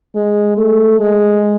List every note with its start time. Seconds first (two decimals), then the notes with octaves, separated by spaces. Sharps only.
0.15 G#3
0.57 A3
1.00 G#3